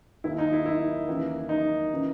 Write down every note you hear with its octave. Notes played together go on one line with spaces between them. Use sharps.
D#2 D#3 E4
D#4
E4
E4
D#2 C#3 E3
D#4
C#3 E3